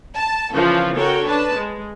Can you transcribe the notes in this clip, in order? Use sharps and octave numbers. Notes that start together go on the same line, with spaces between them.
A5
C#3 E3 F3 C#4 F4 A4
F#4 A4 A#4 C#5 G5
D4 B4 A5
G#3